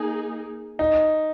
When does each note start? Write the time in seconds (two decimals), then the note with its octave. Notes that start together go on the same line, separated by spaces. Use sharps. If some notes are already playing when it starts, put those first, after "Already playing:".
Already playing: A#3 D#4 G#4
0.79 D#4